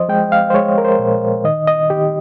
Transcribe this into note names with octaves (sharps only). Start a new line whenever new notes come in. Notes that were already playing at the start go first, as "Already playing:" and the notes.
Already playing: F3 C5 D#5
G#3 G5
F5
C5
G#3 C#5
A#4
C5
A#2
D#3 D#5
D#5
D#3 G4